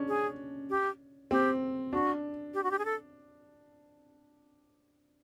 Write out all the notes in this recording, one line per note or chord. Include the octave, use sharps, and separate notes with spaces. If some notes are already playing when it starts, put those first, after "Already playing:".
Already playing: C#4 D4
G#4
G4
C4 G4
D4 F#4
G4
F#4
G4
G#4
A4